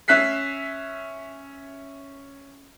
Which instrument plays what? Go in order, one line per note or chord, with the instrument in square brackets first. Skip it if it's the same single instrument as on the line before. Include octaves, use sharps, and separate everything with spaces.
[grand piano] C#4 E5 F#6 B6 C7